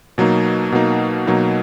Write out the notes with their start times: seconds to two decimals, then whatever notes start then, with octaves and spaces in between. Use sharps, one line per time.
0.18 B2 F#3 A#3 D#4
0.72 B2 F#3 A#3 D#4
1.27 B2 F#3 A#3 D#4